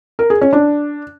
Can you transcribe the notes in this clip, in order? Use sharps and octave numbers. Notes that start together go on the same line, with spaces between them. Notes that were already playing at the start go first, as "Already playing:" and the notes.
A#4
G#4
C#4
D4